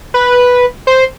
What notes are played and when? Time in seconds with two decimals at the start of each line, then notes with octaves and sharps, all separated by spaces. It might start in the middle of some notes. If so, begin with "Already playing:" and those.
0.14 B4
0.87 C5